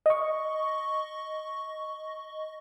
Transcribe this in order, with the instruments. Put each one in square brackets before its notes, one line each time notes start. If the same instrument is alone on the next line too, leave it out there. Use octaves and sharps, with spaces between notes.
[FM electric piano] D#5 C#6